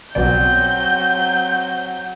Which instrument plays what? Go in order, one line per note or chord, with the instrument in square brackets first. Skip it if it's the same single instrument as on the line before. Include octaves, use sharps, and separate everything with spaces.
[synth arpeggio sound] B1 B2 D5 [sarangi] F#3 [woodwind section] C4 [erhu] G6